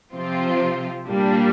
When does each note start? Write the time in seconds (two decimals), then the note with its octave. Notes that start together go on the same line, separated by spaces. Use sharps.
0.13 C3 F3 C4 F4
1.08 A#2 G3 A#3 D4